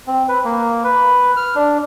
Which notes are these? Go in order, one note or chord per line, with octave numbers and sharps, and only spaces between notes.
C4
B4
A#3
B4
F6
D4